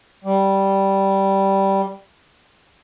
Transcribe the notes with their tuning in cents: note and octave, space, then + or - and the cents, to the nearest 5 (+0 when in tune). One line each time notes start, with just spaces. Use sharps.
G3 -10